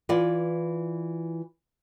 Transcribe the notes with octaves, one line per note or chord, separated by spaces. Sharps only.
E3 F4 D5